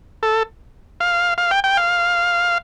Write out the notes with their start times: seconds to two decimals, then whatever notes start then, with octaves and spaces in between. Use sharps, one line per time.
0.23 A4
1.00 F5
1.38 F5
1.51 G5
1.64 G5
1.77 F5